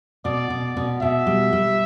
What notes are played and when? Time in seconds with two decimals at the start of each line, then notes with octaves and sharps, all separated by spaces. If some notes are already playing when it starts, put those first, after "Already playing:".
0.25 B2 D5
0.50 B2
0.77 B2
1.02 B2 E5
1.26 G3
1.53 G3